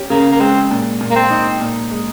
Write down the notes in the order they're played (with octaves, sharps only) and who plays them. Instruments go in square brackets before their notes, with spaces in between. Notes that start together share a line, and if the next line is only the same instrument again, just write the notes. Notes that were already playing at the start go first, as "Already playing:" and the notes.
Already playing: [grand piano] C#4 G4
[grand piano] C#3 [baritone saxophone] A#3
[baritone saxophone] A#3
[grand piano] G#3 [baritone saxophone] C4
[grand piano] A#2
A#2
[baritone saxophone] A#3
C4
[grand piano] D#4
A#2
G#3